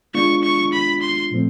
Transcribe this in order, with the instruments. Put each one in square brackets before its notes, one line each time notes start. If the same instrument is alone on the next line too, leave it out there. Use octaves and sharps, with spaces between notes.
[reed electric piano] G#3 B3 D4 F4 [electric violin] C#6
[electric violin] C#6
B5
C6
[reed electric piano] A#2 F3 A3 C4